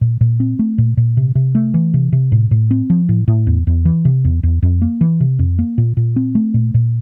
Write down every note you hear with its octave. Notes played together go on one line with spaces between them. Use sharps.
A#2
A#2
C4
A3
A#2
A#2
C3
C3
A3
E3
C3
C3
A2
A2
C4
F3
A2
A2
E2
E2
E3
C3
E2
E2
F2
A#3
E3
C3
F2
A#3
A#2
A#2
C4
A3
A#2
A#2